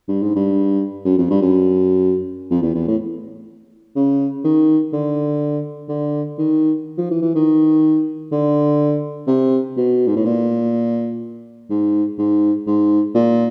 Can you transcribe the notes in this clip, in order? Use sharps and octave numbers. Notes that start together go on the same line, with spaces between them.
G2
G#2
G2
F#2
F2
G2
F#2
F2
E2
E2
A2
C#3
D#3
D3
D3
D#3
F3
E3
E3
D#3
D3
C3
B2
G#2
A2
A#2
G#2
G#2
G#2
A#2